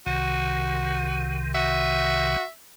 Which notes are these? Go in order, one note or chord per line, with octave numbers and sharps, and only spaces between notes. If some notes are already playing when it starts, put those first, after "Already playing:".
C2 C3 D#3 F#4
F#4 E5